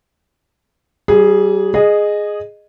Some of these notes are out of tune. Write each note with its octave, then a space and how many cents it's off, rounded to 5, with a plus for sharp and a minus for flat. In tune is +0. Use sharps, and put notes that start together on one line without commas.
G3 -35 G#4 +0
G#4 +0 D#5 -15